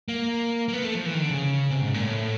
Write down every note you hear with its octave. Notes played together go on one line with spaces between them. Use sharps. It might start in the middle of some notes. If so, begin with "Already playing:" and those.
A#3
A#3
B3
A3
F3
E3
D#3
D3
C#3
C3
G#2
A#2
A2